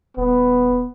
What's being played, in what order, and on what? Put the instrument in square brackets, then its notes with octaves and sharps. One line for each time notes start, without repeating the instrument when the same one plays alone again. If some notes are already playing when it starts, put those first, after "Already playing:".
[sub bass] D#1 [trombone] B3